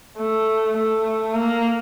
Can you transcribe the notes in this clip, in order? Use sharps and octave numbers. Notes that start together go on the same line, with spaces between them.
A3
A3
A#3